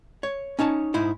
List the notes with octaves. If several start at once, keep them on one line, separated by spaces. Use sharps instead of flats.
C#5
C#4 D#4 C#5 A5
G#2 D#4 E4 C5